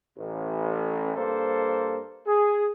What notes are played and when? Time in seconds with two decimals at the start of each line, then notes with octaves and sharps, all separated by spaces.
0.18 A1
1.15 G2 A#3 A4 C5
2.26 G#4